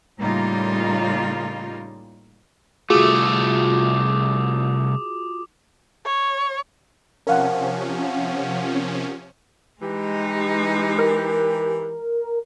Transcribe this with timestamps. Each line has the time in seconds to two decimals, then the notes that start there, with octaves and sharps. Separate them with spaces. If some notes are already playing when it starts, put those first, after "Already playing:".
0.19 A2 C#3 G3 A#3 D#4 F4
2.90 C2 A3 F4 F#4 G#4 D6 D#6
6.05 C#5
7.27 C3 F3 C#4 A#4 F5 F#5
9.81 E3 G#3 D#4 G4
10.99 A#4